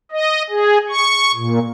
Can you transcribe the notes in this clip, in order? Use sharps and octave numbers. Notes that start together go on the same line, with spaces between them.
D#5
G#4
C#6
A#2